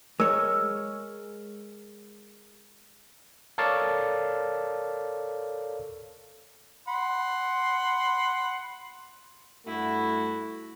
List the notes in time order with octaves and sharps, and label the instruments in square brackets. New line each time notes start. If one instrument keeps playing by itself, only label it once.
[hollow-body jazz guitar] G#3 C#5 [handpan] A#4 [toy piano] E6
[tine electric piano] A4 A#4 C#5 D5 F5 A5
[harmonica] F#5 B5 C6
[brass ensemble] G2 A3 F#4 [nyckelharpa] E4